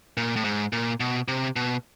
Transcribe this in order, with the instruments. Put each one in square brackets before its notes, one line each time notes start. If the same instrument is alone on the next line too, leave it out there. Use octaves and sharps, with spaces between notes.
[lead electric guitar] A#2
A2
G#2
A#2
B2
C3
B2